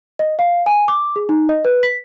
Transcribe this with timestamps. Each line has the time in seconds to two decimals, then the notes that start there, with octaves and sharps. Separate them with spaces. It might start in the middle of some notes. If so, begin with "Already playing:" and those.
0.19 D#5
0.39 F5
0.66 G#5
0.88 D6
1.16 G#4
1.29 D#4
1.49 D#5
1.65 B4
1.83 B6